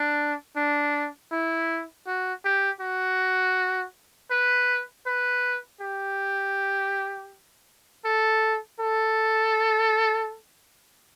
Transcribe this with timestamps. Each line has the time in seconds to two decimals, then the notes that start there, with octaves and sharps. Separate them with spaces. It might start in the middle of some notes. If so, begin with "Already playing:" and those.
Already playing: D4
0.56 D4
1.32 E4
2.07 F#4
2.44 G4
2.81 F#4
4.31 B4
5.06 B4
5.81 G4
8.05 A4
8.80 A4